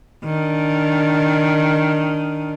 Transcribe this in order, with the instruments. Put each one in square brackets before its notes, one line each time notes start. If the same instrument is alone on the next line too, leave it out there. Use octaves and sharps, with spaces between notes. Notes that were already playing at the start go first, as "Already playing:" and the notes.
[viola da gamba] D#3 D4